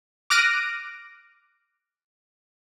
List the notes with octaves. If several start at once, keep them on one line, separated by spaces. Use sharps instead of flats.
D6 F6 F#6 A#6 D7 D#7